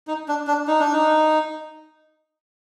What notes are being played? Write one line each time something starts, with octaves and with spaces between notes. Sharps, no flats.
D#4
D4
D4
D#4
D4
D#4